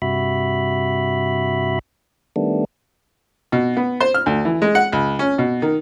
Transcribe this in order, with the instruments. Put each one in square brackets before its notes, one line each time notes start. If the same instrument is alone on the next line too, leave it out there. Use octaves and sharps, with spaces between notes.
[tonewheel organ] G2 C3 F#4 E5 B5
D#3 G3 A3 B3 D4
[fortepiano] B2
B3
C5
F6
D2
E3
G#3
F#5
C#2
C#4
B2
D#3